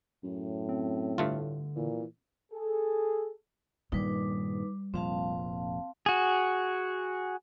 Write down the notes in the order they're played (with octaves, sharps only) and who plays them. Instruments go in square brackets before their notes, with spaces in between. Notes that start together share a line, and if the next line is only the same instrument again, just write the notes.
[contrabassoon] F#2 [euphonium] A2
[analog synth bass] C4
[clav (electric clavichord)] G2 A3 F4 [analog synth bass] D3
[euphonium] A#2 [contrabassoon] E3
[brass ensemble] G#4 A4
[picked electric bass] G2 A#2 D#3 [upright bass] G3 [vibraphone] D#4 B4 D6
[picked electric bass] F1 A#2 F3 [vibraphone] C4 F5 A5
[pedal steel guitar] F#4 G#4